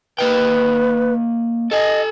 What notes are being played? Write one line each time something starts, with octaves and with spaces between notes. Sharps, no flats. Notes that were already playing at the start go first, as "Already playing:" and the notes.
A#3 B4 D#5 G5
A4 D#5 G#5